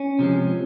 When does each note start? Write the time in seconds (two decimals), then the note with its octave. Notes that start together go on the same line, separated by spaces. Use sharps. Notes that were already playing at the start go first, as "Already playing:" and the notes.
Already playing: C#4
0.19 C3 F3 G#3